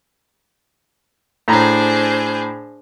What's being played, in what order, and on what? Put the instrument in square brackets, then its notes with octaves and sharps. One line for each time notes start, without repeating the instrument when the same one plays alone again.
[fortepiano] A2 A#5 [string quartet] D4 G#4 C5